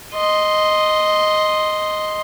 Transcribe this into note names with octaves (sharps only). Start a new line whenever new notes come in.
D#5 C6